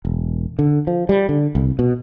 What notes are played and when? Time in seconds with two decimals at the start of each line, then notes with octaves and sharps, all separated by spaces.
0.05 E1
0.59 D3
0.87 F3
1.09 G3
1.29 D3
1.55 C2
1.79 B2